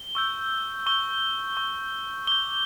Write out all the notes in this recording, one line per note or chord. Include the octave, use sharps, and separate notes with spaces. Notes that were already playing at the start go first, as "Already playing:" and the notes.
Already playing: G7
C#6 E6 G6
C#6 E6 G6 G7
C#6 E6 G6
D6 G6 G7